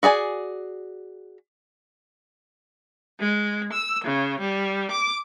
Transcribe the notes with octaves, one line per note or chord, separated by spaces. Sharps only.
F#4 G#4 D5 G#5
G#3
E6
C#3
G3
D6